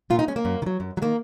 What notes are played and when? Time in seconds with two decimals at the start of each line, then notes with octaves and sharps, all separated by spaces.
0.10 A#2 F4
0.19 D#4
0.28 G#3 C#4
0.36 A#3
0.45 F#2
0.62 D#3
0.66 F#3
0.80 F#2
0.97 F#3
1.02 D#3 A#3